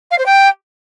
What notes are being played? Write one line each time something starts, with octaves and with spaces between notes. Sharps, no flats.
F5
C5
G5